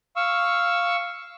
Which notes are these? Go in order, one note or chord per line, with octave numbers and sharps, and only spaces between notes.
F5 C#6 E6